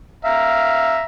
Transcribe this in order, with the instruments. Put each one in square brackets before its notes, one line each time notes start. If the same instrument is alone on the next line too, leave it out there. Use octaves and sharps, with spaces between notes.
[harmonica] E5 F5 A#5